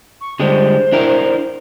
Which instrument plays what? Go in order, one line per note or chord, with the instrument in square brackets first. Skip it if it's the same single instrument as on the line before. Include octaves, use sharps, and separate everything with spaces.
[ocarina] C#6
[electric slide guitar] D3 G3 G#3 [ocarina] C5
[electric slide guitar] D4 E4 A#4